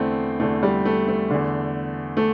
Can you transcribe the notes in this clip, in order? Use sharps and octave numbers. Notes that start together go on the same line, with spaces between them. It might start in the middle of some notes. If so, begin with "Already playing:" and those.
Already playing: E2 D3 A3 C4 E4
E2 D3 A3
G3
A3
A3
E2 D3
A3